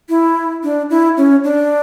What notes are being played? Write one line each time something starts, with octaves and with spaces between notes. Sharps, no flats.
E4
D4
E4
C#4
D4